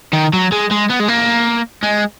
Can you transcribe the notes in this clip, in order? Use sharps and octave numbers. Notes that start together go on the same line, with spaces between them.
D#3
F#3
G#3
G#3
B3
G#3
A#3
G#3